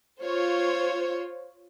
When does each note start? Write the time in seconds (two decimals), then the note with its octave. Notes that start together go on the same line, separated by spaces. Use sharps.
0.20 F4 C5 C#5